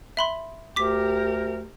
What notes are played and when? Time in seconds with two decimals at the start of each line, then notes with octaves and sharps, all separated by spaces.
0.17 E5 B5 C6
0.76 D2 G4 A#4 D6 B6